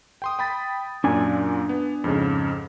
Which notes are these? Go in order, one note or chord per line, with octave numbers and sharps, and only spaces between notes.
G5 C6 D#6
G5 B5 A6
F#2 A#2 D4 G#5
B3
F2 G#2 C#3